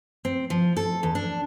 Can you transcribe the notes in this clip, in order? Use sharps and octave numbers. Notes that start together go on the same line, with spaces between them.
C4
F3
A4
E2
D4